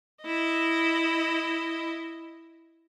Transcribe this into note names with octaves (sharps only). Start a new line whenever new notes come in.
E4 D#5